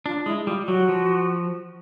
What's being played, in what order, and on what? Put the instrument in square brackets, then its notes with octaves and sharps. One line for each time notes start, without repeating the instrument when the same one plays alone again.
[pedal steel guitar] D4 [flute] F4
[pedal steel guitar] G#3 [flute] E4
[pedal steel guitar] G3 [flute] F4
[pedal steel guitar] F#3 [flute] F#4
[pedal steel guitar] F3